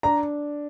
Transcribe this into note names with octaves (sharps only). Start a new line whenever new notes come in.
D4 A#5